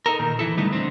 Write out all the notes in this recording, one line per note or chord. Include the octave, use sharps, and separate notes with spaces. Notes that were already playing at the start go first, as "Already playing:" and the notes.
D#4 A4 A#4
A#2 D#3
E3 E4 A4
D3 G3 A3 B3 D#4
D3 C4